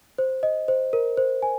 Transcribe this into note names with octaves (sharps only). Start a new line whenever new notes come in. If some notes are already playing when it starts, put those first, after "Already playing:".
C5
D#5
C5
A#4
C5
G#5